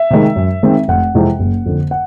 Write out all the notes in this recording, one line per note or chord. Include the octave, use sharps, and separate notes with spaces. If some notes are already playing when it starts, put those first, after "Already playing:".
Already playing: E5
C3 D#3 G#3
F#2
D#3 G#3 C4
F1 F#5
F2 C3 E3 G#3
F#1
F2 D3
F#5